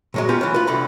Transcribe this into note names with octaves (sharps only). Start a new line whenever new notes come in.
A#2 F#3 G#3
B3 C#4 F4 G4
E3 F#3
F4 B4
C2 D3 B5